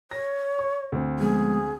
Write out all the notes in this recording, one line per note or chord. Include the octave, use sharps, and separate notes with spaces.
C#5 A#6
C#6
D2 C4
F3 G#3 B3 G#4